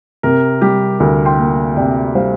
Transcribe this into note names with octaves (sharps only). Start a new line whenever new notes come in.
C3 A#4
G3 G4
D2 A#4
G5 C6
A#3
C3 D5 G5
G3 C5 F5